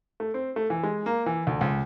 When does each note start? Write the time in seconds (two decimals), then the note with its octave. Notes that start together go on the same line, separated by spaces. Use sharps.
0.20 A3
0.34 C4
0.56 A3
0.70 E3
0.83 G#3
1.06 A#3
1.26 E3
1.47 D2
1.61 C#2